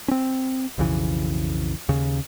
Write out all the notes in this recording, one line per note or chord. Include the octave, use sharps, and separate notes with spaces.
C4 C#4
B1 F2 C#3 E3
D#2 C#3